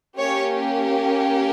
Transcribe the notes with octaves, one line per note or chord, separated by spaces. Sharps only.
A#3 C#4 G4 C#5